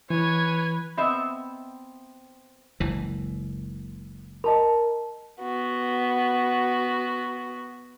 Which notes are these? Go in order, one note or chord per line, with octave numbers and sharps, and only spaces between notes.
E3 B4 C#5 G#5
B3 C4 D#5 E5
F#1 C#2 E3
A#4 D#5 A5 B5
B3 F#4